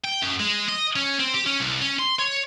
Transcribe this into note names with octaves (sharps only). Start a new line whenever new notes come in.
G5
F#2
G#3
D#5
C#4
C4
G4
C#4
C2
C#4
C6
C#5